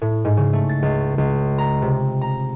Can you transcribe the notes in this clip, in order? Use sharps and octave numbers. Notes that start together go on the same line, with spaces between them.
A2
G#2
C#3
A3
A6
C#2
C#2
A#5
C3
A#5